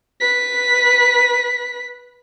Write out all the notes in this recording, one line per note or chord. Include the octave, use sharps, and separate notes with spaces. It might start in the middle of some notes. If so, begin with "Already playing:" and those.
B4 B6